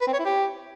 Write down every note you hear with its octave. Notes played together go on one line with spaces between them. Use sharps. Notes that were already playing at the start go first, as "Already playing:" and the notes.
B4
C4
C#5
E4
G4